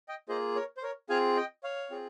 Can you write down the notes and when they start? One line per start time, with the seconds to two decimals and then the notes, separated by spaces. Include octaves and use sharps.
0.09 D#5 G5
0.29 A#3 F4 G#4 C5 D#5
0.56 A#4 C#5
0.77 C5
0.83 A#4 C#5
1.10 C4 F4 G#4 F5 G#5
1.37 D#5 G5
1.64 C#5 F5
1.91 C4 F4 G#4